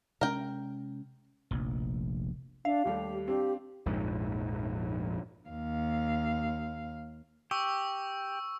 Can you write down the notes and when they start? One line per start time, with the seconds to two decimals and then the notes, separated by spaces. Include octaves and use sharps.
0.21 C3 G#3 C#4 A#4 G5
1.51 F1 A#1
2.65 D4 E5 F5
2.85 D#2 G3 A3 G4
3.28 C4 D4 G4
3.86 A#1 F2 G#2
5.49 D#2 F5
7.51 G4 C#6 E6